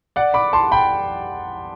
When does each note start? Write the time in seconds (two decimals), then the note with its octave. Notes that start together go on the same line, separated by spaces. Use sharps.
0.16 D5 F#5
0.34 B5 D6
0.53 A5 C6
0.72 G5 B5